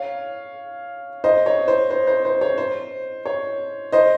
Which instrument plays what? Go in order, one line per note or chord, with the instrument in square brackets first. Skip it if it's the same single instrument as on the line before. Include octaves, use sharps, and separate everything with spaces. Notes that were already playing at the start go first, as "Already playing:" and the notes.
Already playing: [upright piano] C#5 F5
C5 D#5
C#5
C5
C5
C5
C5
C#5
C5
C#5
C5 D#5